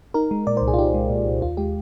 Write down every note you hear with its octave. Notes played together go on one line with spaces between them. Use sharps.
D#4 A#4
G#3
A#2 D5
C5
C2
G#4
F4
D#4 G4
G#3
A#2
C2
D#2 F4
G#3 G4